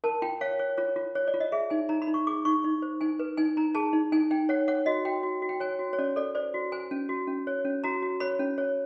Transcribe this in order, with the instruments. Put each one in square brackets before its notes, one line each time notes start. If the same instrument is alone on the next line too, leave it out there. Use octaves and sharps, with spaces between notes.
[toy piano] A#4 A5
F4 G5
C#5 F5
C#5
F4 C#5
F4
C#5
D5
F4
D#5
G#4 E5
D#4 G#5
D#4 A#5
B5
D#4
C#6
G#4 D6
D#4 C#6
D#4
C5
D#4 G#5
B4
D#4 G#5
D#4 A#5
G#4 A5
D#4
D#4 G#5
D#4 G5
C#5 F#5
C#5 F#5
F#4 D#5
F#4 G5
F#4
F#4
G5
C#5 G#5
F#4
C#5
C#4 D5
A4 D5
C5 D5
F#4
C5 G#5
C#4
F#4
C#4
C#5
C#4
F#4 A#5
F#4
C#5 B5
C#4
C#5